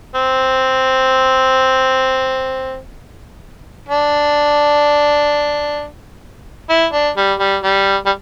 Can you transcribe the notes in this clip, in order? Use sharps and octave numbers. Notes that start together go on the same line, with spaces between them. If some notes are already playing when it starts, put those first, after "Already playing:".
C4
D4
E4
D4
G3
G3
G3
G3